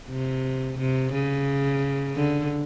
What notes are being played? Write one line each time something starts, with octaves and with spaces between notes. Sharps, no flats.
C3
C3
C#3
D3